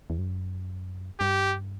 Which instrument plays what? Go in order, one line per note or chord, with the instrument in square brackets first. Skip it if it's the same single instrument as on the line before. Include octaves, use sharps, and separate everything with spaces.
[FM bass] E2
F#2
[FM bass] G2 [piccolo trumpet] G4